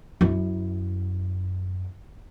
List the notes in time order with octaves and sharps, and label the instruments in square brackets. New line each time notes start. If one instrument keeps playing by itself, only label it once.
[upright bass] F#2 E4